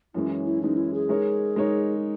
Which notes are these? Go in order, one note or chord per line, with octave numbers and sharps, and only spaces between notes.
F#2 E3 G#3 C#4 E4
E4
E4
F#2 E3 G#3 C#4 D#4
E4
G#4
G#3 D#4 A#4 C#5
G#3 D#4 A#4 C#5